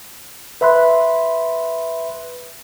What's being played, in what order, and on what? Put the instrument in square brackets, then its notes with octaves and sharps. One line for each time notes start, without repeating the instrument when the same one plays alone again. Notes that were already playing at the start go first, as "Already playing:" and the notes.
[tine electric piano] B4 E5 B5 C6 F#6